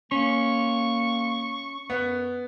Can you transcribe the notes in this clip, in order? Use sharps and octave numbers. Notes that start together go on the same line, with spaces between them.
A#3 C#4 C#6
F#2 B3